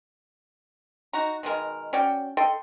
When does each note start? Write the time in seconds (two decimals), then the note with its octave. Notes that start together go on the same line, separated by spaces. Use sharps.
1.13 D#4 F#4 A#5
1.43 B2 D#3 G#3 A#4
1.93 C#4 F#4 D5 G5
2.37 A4 D#5 G5 C6